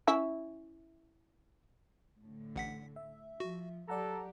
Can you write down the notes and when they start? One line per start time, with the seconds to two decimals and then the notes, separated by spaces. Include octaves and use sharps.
0.07 C#4 E4 E5
2.22 A2 D3
2.56 A1 F#5 B6
2.96 E5
3.40 F3 F#4
3.88 F#3 G4 A4 D5 F#5 A#5